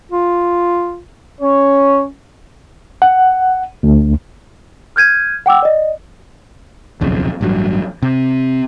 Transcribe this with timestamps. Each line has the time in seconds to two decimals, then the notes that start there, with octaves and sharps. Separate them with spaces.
0.12 F4
1.41 C#4 C#5
3.02 F#5
3.83 D2
4.96 F6 G6 G#6 D#7
5.46 F#5 G5 D6 E6
5.62 D5 D#5
7.01 D#1 B1 F2 C#3
7.41 A1 G2 F#3
8.02 C3